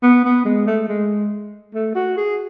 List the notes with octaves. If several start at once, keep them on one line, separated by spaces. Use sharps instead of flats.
B3
B3
G#3
A3
G#3
A3
F#4
G#4